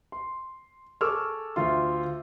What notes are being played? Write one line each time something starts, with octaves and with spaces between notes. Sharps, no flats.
C6
G#4 A4 C#6 D6 E6 F6
D2 F4 C6